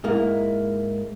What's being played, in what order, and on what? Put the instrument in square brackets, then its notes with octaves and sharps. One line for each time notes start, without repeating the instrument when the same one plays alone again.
[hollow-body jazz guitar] G#2 G#3 A#3 E4